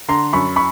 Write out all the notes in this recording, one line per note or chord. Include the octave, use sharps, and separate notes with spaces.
D3 A#5 C6
F#2 B5 C#6
B5 C#6